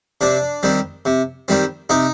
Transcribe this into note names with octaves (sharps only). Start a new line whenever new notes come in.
C3 D4
D#3 G3 C4
C3
D#3 G3 C4
C3 D#4